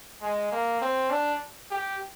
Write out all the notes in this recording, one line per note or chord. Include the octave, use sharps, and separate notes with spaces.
G#3
A#3
C4
D4
G4